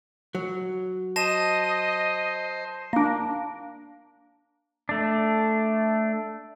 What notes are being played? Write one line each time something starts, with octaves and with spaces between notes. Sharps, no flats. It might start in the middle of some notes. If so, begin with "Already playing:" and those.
F#3
C5 D#5 A5 A#6 E7
A#3 D4
A3 D4